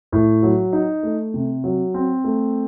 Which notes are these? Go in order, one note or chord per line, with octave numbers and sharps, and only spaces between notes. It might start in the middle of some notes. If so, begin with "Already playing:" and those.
A2
F#3
D#4
A3
C3
F#3
C4
A3